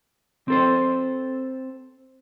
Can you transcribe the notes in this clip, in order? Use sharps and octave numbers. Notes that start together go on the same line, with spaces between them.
C4 A4 C5